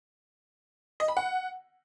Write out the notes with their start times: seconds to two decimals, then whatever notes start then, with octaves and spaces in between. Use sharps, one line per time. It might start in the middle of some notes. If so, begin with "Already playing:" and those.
1.00 D#5
1.08 B5
1.17 F#5